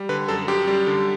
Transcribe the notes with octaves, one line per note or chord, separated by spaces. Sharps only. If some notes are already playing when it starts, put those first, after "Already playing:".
Already playing: G3
D3 B4
F#2 A4
F#2 G4
G3
D3